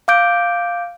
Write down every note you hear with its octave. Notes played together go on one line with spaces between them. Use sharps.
F5 D6 G6 D7